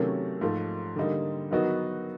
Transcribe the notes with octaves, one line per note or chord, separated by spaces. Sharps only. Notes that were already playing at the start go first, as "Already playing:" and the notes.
Already playing: C3 D#3 F#3 A3 C#4
G#2 F3 A3
D3 G3 A#3 D#4
D#3 F#3 B3 D#4 F#4